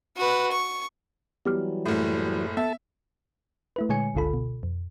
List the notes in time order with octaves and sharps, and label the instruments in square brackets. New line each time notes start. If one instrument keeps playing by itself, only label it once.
[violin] F#4 B4
C#6
[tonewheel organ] E3 F#3 G3 [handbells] B3 G4 F6
[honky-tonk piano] F#1 A2
[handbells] B3 [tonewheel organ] A4 A5 [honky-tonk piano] E5
[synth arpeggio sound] A3 E4 B4
A#2 D3 G#3 C#5 G#5 C#7
G1 C#2 D3 F4 A4 B5
B2
F2